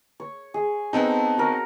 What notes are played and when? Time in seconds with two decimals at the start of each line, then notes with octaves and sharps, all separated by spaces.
0.20 C#5
0.54 G#4
0.93 B3 C4 D#4 A4 A5
1.38 F#4 A#4 C#5